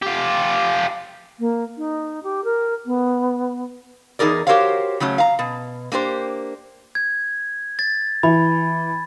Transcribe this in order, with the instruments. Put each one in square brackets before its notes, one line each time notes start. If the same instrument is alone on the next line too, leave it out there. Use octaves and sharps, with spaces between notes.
[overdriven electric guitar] F4 G4
[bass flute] A#3
D#4
G4
A#4
B3
[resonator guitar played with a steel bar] E2 D#4 G#4 A#4 D5
F#4 G4 A#4 C5 C#5 F5
C#3 F#3 A3 C#4
F5 A#5
B2
A#3 D4 G4 C5
[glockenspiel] G#6
A6
[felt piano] E3 [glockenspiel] B5